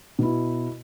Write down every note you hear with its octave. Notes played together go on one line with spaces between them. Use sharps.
B2 E4